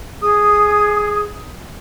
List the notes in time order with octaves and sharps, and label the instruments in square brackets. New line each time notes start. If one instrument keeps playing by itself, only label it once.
[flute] G#4 [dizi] D#6